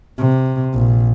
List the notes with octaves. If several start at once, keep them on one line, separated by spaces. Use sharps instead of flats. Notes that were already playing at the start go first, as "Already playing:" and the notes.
C3
A#1